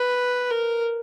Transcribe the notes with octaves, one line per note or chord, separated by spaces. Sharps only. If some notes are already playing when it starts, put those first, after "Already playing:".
Already playing: B4
A#4